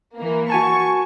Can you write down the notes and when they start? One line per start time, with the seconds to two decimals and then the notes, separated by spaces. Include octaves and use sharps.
0.17 E3 A#3
0.50 F#4 G#5 A5 C#6